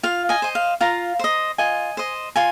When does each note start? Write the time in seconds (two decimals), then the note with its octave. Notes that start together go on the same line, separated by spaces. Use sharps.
0.03 F4 F5
0.29 D#5 G#5
0.42 C5 D#5
0.55 F5
0.81 F4 F5 A#5
1.19 C5 D#5
1.58 F4 D#5 G#5
1.97 C5 D#5
2.36 F4 G#5 C6